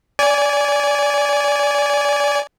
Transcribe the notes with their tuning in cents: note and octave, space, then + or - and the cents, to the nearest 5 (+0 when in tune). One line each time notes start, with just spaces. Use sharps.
D5 -25 G#5 +0